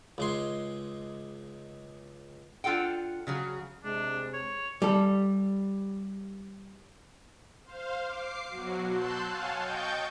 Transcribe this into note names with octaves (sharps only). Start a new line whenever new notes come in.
C#2 G#3 C6
D4 F4 A4 F#5 G5
C#3 F#3 G#4
C3 G#3 D4
C#5
G3 A4
C5 F5
D6 C7
B2 F#3 F#4
A5 C6 E6 F#6 G6
C#5 F5 F#5 G#5 A5
D#5 G5 C#6 G6 A6